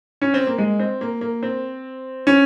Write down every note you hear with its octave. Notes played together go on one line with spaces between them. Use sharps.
C#4
C4
A#3
G#3
C4
A#3
A#3
C4
C#4